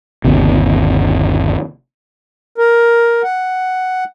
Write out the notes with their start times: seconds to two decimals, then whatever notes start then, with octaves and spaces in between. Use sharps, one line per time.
0.25 G1 D#2 C3
2.58 A#4
3.23 F#5